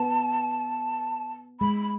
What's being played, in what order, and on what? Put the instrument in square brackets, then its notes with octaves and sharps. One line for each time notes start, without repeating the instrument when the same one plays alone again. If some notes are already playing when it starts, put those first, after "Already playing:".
Already playing: [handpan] B3 [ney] A5
[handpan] G#3 [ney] B5